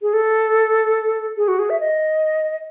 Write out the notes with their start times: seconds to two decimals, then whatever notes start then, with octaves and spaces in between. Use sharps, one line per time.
0.02 G#4
0.13 A4
1.37 G#4
1.48 F#4
1.59 G#4
1.70 E5
1.80 D#5